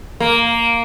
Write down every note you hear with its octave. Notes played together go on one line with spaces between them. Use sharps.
A#3